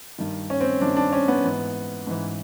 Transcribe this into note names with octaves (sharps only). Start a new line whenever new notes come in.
G2 D#3
C#4
C4
G2 D#3 D4
D4
C#4
B3
G#2 E3
G#2 E3